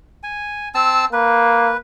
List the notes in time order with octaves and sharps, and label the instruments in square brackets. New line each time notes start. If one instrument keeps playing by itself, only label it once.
[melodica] G#5
C4 A5 E6
[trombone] A#3 [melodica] B4